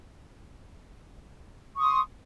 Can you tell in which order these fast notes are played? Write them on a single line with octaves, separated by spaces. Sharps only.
C#6 D#6 C6